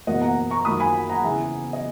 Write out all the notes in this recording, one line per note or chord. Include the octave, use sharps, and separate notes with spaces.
F#1 E2 B2 A#3 D#5 F#5
F#5 A#5
A#5 C#6
F#2 D#3 A#3 B5 D#6
G#5 B5
F#5 A#5
E2 C#3 E3 B3 E5 G#5
D#5